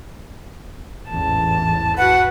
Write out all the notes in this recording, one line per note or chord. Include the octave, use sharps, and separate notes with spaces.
A1 E2 G#2 A5
F#4 B4 F#5